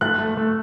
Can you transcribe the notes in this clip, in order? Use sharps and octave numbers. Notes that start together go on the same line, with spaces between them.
A3 F#6
A3
A3